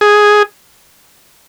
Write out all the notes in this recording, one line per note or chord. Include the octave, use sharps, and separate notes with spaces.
G#4